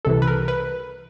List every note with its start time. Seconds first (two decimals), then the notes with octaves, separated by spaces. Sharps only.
0.05 C2 C3 E3 A4
0.22 B4
0.27 A#4
0.48 B4